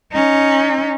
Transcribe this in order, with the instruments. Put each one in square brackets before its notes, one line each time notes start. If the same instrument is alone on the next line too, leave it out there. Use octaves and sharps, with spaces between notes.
[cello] C#4 D#4